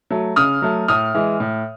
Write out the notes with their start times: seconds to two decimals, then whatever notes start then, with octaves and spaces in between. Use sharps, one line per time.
0.10 F#3 A3
0.36 C#3 D#6 F6
0.62 F#3 A3
0.88 A2 D#6 F6
1.14 E3 G#3
1.40 A2